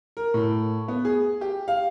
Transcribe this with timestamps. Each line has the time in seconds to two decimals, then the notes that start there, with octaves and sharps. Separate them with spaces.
0.17 A#4
0.34 A2
0.88 B3
1.05 G#4
1.41 G4
1.68 F5